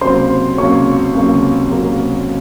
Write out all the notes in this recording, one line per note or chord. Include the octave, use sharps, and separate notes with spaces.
C#2 C3 F#3 A#3 C5 C6
C#2 C3 F#3 A#3 C#5 C#6
C#2 C3 F#3 A#3
C#2 C3 F#3 A#3